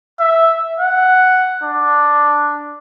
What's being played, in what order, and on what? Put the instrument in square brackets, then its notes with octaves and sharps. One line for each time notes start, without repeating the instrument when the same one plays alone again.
[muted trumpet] E5
F#5
D4